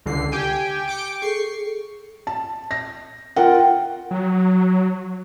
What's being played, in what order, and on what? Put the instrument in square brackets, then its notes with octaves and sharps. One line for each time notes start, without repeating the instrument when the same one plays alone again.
[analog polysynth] C#2 D3 C7
G4 G5 G#5
G5 D6 C#7
[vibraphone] G#4 A4 [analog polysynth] C#6 C7
[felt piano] A5
A#6
[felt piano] F4 A#4 F#5 [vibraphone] G5
[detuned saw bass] F#3